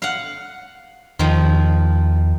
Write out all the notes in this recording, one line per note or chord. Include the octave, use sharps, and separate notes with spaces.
F5 F#5
E2 D#3 F3